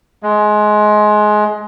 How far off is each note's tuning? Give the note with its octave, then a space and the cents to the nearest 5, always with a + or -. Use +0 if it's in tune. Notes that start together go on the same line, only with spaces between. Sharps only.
G#3 +20